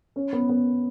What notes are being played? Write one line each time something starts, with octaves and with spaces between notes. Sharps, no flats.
C#4
B3
B3